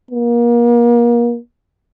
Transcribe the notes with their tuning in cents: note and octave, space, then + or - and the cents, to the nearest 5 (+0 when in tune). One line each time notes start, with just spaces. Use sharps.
A#3 +35